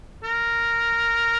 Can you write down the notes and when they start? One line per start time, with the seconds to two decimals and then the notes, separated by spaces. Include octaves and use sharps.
0.24 A#4